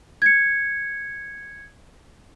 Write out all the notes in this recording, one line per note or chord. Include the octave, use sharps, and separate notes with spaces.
G#6 C#7